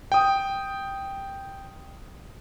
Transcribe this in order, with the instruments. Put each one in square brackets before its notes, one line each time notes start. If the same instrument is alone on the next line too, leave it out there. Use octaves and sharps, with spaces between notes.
[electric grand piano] G5 D#6